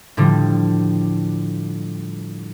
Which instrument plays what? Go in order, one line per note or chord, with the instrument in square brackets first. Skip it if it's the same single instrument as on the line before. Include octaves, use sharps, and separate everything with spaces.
[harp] A2 D3 F3 G3